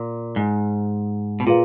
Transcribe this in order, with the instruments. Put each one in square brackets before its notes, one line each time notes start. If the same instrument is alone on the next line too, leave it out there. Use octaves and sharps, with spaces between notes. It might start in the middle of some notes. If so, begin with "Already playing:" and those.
Already playing: [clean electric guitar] A#2
G#2
B2
[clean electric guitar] A#2 [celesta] F4 G#4 B4 F5